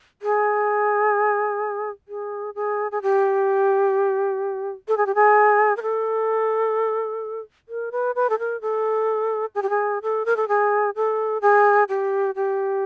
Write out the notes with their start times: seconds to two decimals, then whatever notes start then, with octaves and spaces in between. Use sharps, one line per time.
0.22 G#4
2.08 G#4
2.55 G#4
2.92 G#4
3.02 G4
4.88 A4
4.97 G#4
5.06 G4
5.15 G#4
5.77 A#4
5.82 A4
7.69 A#4
7.92 B4
8.15 B4
8.30 A4
8.39 A#4
8.62 A4
9.55 G#4
9.62 G4
9.70 G#4
10.03 A4
10.26 A#4
10.37 A4
10.48 G#4
10.96 A4
11.42 G#4
11.89 G4
12.36 G4